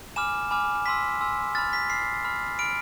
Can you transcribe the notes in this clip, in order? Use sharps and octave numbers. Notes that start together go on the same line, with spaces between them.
G#5 B5 D6 F6 E7
G#5 B5 D6 F6
G#5 C6 E6 B6
G#5 C6 E6
B5 F6 A6
B6
B5 F6 C7
B5 F6
B5 F6 D7